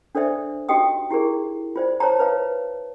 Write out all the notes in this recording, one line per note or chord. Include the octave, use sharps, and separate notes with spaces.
D4 A4 C5 D5 E5
D#4 F#4 G4 D#5 G5 D#6
E4 G4 G#4 A#4
F4 C5 D5
C5 C#5 A5 A#5
B4 C#5 F5 A#5